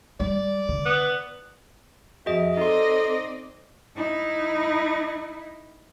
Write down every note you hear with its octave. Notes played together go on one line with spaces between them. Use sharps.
G3 D5
D3
B3
F2 F#4 G#4 D#5 E5
C4 D#4 A4 D5 D#5 C6
D#4 E4